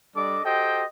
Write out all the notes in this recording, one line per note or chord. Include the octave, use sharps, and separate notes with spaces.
G3 D4 A4 D5 D#5 D6
F#4 G4 A4 C5 D#5 G5